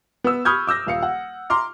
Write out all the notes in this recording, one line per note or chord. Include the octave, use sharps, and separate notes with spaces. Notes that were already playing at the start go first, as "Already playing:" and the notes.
B3 E6
B5 C#6 D#6 F6 G6 G#6
D6 E6 G6 A#6
D#1 F5 C#7
F#5
A#5 C6 D6 F6